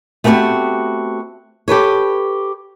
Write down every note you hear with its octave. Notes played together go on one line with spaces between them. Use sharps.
A3 B3 C4 D4 F#4 G4
G4 A4 B4 C#5